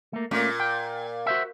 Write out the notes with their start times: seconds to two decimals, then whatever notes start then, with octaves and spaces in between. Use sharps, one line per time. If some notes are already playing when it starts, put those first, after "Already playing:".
0.13 A3 A#3
0.31 A#2 A3 A#3 C#4
0.60 G5
1.26 F#4 C5 E5